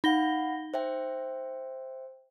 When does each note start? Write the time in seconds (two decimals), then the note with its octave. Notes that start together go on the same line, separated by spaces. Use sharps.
0.04 D#4 F5 F#5 B5 A#6 G7
0.74 C5 E5 G5